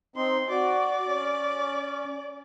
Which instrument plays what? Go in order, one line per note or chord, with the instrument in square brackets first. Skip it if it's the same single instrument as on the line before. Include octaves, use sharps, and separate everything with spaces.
[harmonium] C4 D#4 [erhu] C6
[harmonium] F#4 [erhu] D5
[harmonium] C#4